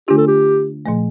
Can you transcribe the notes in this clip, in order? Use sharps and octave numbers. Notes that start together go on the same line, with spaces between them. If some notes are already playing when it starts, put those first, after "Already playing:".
D3 A3 D4 F4 G4
A4
G4
A#2 F3 A3